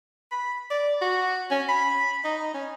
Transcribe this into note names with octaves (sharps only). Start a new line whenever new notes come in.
B5
D5
F#4
C#4
B5
D#4
C#4